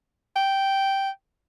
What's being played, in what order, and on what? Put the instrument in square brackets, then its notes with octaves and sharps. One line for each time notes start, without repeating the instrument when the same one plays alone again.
[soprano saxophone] G5